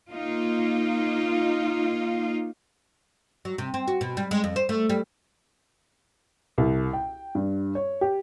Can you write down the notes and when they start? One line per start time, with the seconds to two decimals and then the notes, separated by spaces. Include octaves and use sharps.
0.12 A#3 D#4 F4
3.45 F#3
3.58 C3
3.74 C4
3.88 F#4
4.01 B2
4.17 G3
4.31 G#3
4.44 F2
4.56 C5
4.69 A3
4.89 G3
6.58 C2
6.93 G5
7.35 G2
7.75 C#5
8.01 G4